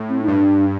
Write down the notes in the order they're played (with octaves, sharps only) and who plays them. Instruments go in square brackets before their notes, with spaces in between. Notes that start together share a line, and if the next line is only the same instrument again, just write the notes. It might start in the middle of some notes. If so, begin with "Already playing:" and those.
Already playing: [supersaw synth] A2
[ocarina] C4
D#4
[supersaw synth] G2 [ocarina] D4